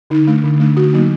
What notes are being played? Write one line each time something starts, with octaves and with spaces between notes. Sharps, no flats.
D3 D#4
A3 D4
D3
A3 D4
D3 F#4
F#3 A#3 D#4